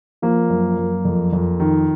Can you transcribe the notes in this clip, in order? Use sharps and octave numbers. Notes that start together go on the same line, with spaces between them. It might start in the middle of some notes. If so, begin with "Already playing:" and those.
F3 A#3
F#2
F#2
F2
F2
D#3